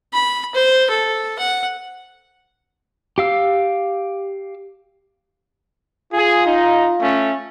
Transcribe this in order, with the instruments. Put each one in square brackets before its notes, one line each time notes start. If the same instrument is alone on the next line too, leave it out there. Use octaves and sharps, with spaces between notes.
[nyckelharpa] B5
C5
A4
F#5
[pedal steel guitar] G4 F5 E6
[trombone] F4 [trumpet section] G#4
[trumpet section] D#4
A3 C#4